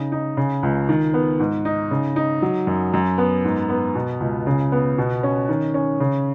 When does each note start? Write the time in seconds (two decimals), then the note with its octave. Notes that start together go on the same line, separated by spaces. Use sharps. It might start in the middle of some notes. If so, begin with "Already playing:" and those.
Already playing: C#3 D#4
0.12 D#4
0.37 C#3
0.63 C#2
0.89 D#3
1.14 B3
1.40 G#2
1.65 D#4
1.91 C#3
2.16 D#4
2.42 F#3
2.67 F#2
2.94 F#2
3.18 B3
3.45 G#2
3.69 B3
3.95 B2
4.20 C#2
4.47 C#3
4.72 B3
4.98 B2
5.23 C#4
5.49 D#3
5.74 C#4
6.00 C#3